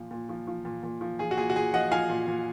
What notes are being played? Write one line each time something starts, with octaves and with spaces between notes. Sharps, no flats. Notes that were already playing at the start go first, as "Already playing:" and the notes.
Already playing: A#2 F3
A#2
F3
F3
A#2
A#2
F3
F3 G#4
F#4
A#2 G#4
F#4
A#2 G#4
F3 D#5 F#5
F3 F5 G#5
A#2
A#2